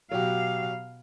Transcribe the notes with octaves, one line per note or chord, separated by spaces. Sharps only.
B2 F#3 F#4 G4 F5